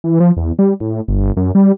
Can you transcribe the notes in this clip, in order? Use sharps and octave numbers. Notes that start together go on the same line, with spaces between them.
E3
F3
E2
G3
A2
G1
F#2
G3